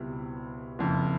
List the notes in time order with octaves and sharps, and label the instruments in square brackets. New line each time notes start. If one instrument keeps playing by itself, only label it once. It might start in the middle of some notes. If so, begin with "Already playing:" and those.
Already playing: [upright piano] C#2 B2 G3 C4 E4
F#1 F2 C#3